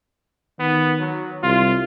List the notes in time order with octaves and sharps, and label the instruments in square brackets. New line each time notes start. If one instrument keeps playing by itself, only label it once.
[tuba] D#3 [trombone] B3
[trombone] F#3
[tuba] C2 [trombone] F4